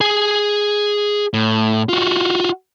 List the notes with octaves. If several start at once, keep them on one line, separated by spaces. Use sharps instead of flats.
G#4 G#5
A2
F4 F#4